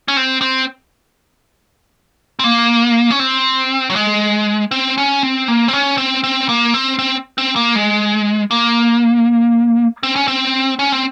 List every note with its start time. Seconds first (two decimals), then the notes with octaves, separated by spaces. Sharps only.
0.08 C#4
0.17 C4
0.41 C4
2.39 C4
2.44 A#3
3.11 C#4
3.20 C4
3.90 F#3
3.96 G#3
4.71 C4
4.98 C#4
5.23 C4
5.48 A#3
5.68 C4
5.73 C#4
5.98 C4
6.24 C4
6.49 A#3
6.74 C4
6.99 C4
7.38 C4
7.56 A#3
7.75 G#3
8.51 A#3
10.03 C4
10.16 C#4
10.28 C4
10.79 C#4
10.92 C4